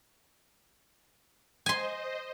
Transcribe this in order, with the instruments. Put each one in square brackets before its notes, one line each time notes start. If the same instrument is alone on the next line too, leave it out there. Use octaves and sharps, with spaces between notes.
[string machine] C5 D#5 [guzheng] G#5 C6